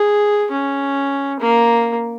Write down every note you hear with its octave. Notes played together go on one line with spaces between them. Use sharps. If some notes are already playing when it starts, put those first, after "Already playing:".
Already playing: G#4
C#4
A#3